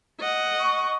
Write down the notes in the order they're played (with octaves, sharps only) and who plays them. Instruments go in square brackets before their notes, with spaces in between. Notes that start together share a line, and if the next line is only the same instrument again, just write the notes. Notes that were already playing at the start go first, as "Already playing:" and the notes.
[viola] D#5 F#5
[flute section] C#6